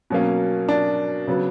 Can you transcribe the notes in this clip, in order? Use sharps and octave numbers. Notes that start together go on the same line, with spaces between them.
B2 F#3 A#3 C#4
D4
C#3 F#3 B3